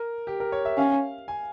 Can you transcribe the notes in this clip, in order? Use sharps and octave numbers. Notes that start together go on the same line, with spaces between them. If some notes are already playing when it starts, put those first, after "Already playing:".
Already playing: A#4
G4
A#4
C#5
E5
C#4 F5
G#5